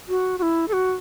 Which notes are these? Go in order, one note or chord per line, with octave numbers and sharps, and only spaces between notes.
F#4
F#4
E4
A4
F#4